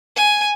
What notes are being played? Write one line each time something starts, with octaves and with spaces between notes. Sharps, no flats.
G#5